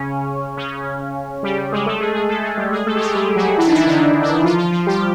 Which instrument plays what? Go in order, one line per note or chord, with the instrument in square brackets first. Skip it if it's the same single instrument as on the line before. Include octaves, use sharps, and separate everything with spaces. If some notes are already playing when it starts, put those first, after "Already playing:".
Already playing: [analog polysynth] C#3 C#4
C#3 C#4
G3 G4
G3 G4
G#3 G#4
A3 A4
G#3 G#4
G#3 G#4
A3 A4
G#3 G#4
G3 G4
G#3 G#4
A3 A4
G4
G#3 G#4
G3 G4
F#3 F#4
E3 E4
D4
D#3 D#4
D3 D4
D3 D4
F3 F4
F3 F4
F3 F4
G3 G4